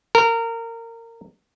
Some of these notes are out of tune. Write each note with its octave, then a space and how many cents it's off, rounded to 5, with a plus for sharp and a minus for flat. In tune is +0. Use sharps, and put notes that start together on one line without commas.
A#4 -25